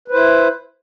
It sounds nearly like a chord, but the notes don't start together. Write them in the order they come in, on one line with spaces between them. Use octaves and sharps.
B4 C5 E4